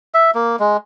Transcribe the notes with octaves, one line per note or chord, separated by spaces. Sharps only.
E5
A#3
G#3